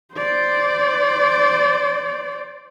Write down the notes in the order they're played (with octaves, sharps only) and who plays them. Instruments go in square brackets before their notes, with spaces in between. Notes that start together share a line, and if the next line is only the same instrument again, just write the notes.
[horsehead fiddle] C5 D5